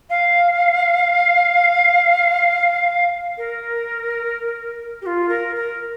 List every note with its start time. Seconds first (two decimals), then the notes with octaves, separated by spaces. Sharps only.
0.09 F5
3.37 A#4
5.01 G4
5.06 F4
5.28 A#4
5.55 A#4